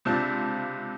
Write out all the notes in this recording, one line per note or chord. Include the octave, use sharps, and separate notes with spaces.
C#2 C3 C4 D4 F4 A5